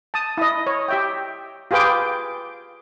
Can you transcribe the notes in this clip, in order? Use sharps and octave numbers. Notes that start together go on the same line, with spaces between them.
A5 D#6
E4 D#5
C#5
G4 E5 G5
F4 G4 G#4 B4 G5 D6